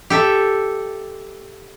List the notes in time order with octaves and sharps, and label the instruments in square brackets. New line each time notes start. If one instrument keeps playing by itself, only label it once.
[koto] G4 A4 E5